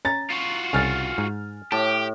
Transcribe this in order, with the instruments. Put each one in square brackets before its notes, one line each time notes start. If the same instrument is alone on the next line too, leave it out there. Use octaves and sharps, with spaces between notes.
[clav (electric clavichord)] C#4 [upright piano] A#5 A6
[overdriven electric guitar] F4 F#4
[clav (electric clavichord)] C2 C#3 [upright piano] G#5 F6 A6
[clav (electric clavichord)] G#2
[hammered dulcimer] A2 [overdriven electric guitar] G4 [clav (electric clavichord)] A5